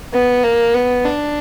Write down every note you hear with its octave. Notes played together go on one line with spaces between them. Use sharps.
B3
A#3
B3
D4